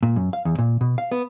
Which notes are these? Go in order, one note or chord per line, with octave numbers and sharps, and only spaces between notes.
A#2
F#2
F5
E2
A#2
B2
F5
B3